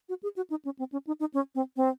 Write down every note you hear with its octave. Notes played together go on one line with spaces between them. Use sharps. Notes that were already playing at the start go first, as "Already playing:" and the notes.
F#4
G#4
F#4
D#4
C#4
C4
C#4
D#4
D#4
C#4
C4
C4